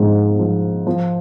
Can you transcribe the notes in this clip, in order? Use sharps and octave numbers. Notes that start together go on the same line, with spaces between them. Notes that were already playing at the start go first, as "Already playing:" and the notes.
Already playing: G#2 F3
F3
F3